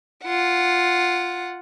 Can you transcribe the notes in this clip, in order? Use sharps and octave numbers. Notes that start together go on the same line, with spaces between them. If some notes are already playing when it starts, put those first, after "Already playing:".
F4 F#5